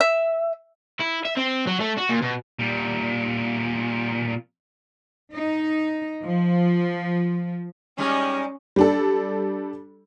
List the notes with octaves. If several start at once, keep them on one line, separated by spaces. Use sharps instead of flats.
E5
E4
E5
C4
F#3
A3
F#4
A#2
B2
A#2 G3
D#4
F3
G3 G#3 C#4 D#4
G3 D4 A4